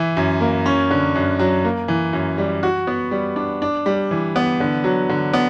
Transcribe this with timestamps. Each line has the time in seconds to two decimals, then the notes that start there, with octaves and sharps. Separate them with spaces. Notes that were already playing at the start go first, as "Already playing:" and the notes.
Already playing: E3 E4
0.17 F#2
0.41 A#3
0.66 C#4
0.91 D3
1.15 F#2
1.39 F#3
1.65 A#3
1.88 E3
2.13 F#2
2.38 G3
2.63 F#4
2.87 B3
3.11 G3
3.36 D4
3.62 D4
3.86 G3
4.11 E3
4.36 B3
4.60 D3
4.84 F#3
5.09 D3
5.33 B3